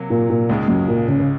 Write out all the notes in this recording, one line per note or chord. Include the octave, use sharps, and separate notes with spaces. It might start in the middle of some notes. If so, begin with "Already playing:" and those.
Already playing: C3 F#3 A#3
A#2
A#2
C#2 G#2 C#3 G#3
F#2
A#2
C#3
C#3